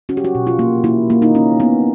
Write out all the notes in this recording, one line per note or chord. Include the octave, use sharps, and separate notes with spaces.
C#4 F#4
G4
F#4
B2
F4
A#3
A#3 E4
A#3
D#4
C#4
B3